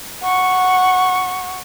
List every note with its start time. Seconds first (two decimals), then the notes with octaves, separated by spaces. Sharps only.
0.22 F#5 C#6